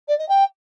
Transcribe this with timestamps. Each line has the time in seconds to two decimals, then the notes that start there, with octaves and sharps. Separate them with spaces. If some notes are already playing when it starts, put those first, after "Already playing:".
0.08 D5
0.18 D#5
0.29 G5